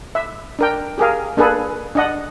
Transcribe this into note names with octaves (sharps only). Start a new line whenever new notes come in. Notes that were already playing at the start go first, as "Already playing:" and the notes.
E5
D4 A#4 G5
G4 G#4 A#4 F5
A#3 D4 G#4 A4 B4
D4 D#5 F#5